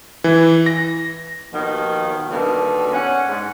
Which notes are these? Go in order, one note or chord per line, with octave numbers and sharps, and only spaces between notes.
E3
A#6
D#2 B2 D#3 F3
B2 D3 D#3 G3 A#3
C#4 F#5
G#2